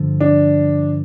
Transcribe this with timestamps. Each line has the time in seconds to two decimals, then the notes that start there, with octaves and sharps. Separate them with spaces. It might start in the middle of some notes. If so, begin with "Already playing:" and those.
Already playing: G2 D3 F3
0.21 D4